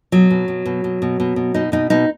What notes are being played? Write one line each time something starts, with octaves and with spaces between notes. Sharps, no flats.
B2 F#3
B2
B2
B2
B2
B2
B2
B2
B2 D#4
B2 D#4
B2 D#4